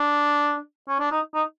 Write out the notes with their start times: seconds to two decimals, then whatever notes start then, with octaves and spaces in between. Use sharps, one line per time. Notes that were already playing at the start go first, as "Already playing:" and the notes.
Already playing: D4
0.88 C#4
1.00 D4
1.11 D#4
1.34 D#4